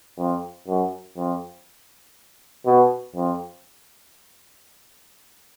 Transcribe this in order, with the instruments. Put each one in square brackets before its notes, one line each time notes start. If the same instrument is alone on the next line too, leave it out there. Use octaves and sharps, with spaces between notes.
[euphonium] F2
F#2
F2
B2
F2